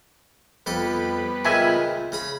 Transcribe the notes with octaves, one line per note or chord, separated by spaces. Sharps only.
F2 G3 B3 A4 B4 D6
C#2 A#2 C4 E5 G#5 B5
C#3 A#5 B5